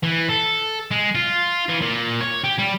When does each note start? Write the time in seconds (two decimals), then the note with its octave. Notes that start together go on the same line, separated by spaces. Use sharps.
0.03 E3
0.29 A4
0.91 G#3
1.15 F4
1.69 E3
1.82 A#2
2.21 C#5
2.44 G4
2.58 G3